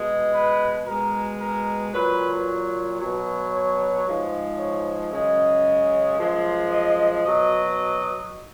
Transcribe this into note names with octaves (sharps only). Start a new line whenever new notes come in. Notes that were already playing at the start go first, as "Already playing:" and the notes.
Already playing: B2 G#3
B4
B2 G#3 A#4
A#4
A#2 F#3 B4
B2 F#3
C#5
G#2 F3 G#3
C#5
F#2 C#3 G#3 D#5
F#2 F3 G#3
D#5
B2 F#3 D#5